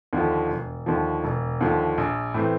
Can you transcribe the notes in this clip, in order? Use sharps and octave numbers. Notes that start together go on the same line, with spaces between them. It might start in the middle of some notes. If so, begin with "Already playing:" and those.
D#2 D3 F3
E1
D#2 D3 F3
E1
D#2 D3 F3
A#1
A2 E3 A3 C4